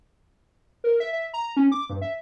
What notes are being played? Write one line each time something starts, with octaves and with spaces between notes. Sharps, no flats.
A#4
E5
E5
A#5
C#4
D6
G2
E5